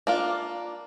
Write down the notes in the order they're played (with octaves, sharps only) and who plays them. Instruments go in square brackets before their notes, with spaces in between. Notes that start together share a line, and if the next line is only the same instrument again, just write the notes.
[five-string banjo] A#3 D4 F4